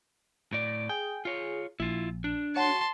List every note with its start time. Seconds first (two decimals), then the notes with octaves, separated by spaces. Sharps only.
0.53 A2 D5
0.89 G#4 G5
1.25 F4 C#5
1.80 A#1 E4 F4
2.24 D4
2.56 F#4 C#5 A5 C6 C#7